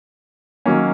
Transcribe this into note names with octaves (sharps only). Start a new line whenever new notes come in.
D#3 F#3 A#3 C#4